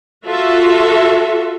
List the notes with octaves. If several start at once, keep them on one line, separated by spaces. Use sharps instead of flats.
F4 F#4 A4 E5